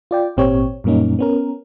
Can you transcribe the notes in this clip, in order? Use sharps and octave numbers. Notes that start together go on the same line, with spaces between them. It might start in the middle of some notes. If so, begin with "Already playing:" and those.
F4 D5 G5
G#1 A#2 C4 G4 C#5
F#2 A#2 G3 A#3 C#4 D#4
B3 C#4 A#4